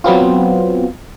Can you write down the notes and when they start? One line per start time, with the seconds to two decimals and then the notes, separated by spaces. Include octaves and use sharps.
0.04 F#3 B3 C4 F4